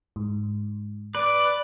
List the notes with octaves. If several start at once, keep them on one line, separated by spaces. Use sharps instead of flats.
G#2
B4 D5 D6